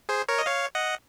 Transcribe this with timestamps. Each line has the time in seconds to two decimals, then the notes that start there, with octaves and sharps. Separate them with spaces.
0.09 G#4 C5
0.29 A#4 C#5
0.38 D#5
0.46 C#5 F5
0.75 D#5 F#5